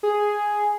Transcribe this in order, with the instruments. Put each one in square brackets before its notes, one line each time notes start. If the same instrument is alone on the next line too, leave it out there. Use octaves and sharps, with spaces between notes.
[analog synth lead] G#4